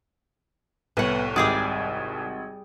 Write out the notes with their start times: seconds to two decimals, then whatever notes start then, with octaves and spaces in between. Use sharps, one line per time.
0.97 C2 A2 B3 C#5 F#5
1.36 G#1 G3 G#4 D5 D#6